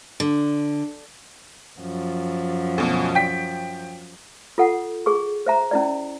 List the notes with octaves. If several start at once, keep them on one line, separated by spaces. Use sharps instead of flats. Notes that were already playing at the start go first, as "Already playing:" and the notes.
D3
F#2 F3
D2 B2
G5 B6
F4 A4 F#5
G#4 C#6
C5 E5 A#5
C#4 E4 D5